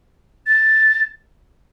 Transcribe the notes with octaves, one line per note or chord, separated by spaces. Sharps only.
A6